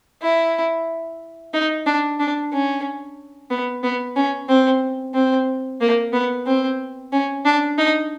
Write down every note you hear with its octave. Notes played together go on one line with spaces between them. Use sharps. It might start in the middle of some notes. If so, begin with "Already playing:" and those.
E4
D#4
D4
D4
C#4
B3
B3
C#4
C4
C4
A#3
B3
C4
C#4
D4
D#4